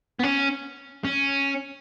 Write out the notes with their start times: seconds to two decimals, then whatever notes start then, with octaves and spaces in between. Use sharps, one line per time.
0.19 B3
0.23 C#4
1.05 C#4